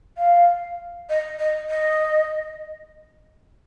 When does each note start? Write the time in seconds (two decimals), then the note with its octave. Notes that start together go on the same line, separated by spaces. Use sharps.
0.18 F5
1.09 D#5
1.39 D#5
1.70 D#5